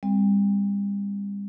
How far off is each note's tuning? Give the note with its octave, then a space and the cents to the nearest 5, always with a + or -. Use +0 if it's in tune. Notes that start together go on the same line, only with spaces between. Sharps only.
G3 +40 C4 +0